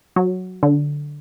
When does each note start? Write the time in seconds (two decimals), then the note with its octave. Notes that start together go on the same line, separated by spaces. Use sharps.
0.16 F#3
0.63 D3